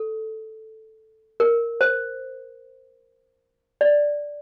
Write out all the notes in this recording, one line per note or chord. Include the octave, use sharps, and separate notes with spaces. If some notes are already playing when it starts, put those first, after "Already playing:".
Already playing: A4
A#4
C5
D5